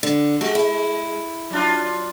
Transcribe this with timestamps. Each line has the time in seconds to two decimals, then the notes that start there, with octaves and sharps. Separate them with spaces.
0.03 D3
0.41 G#3 F#4 G4
0.55 E4
1.50 F#3 D4 F4